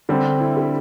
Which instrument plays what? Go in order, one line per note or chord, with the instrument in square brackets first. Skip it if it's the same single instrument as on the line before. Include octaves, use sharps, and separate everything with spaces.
[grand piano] D3 G3 C4 [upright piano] D4
[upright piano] E4
G4